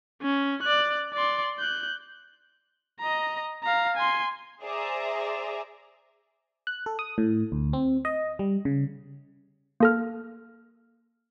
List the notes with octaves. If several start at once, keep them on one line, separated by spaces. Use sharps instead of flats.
C#4
D5 F#6
D5 C6
F#6 G6
D#5 A#5
F5 A#5
G#5 C6
G#4 C5 D5 E5 A#5 D#6
F#6
A4
D#6
A2
D2
C4
D#5
G3
C#3
A#3 A4 F6